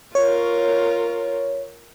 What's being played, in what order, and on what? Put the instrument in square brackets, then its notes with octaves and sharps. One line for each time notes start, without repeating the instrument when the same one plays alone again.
[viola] F4 A#4 [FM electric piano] C#5